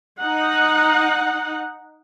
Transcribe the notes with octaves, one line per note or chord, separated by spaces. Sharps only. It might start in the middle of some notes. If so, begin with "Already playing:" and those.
D#4 F#5